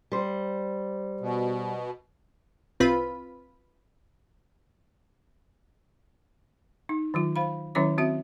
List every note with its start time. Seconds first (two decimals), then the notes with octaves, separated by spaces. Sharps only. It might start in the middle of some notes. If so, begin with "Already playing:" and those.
0.12 G3 C5
1.20 B2
2.80 C2 C4 F4 B4 B5
6.89 D#4
7.14 D#3 F#3 F4
7.36 C5 F5 B5
7.75 D#3 F#3 C#4 E4 C#5 D6
7.98 C4 F#4 E5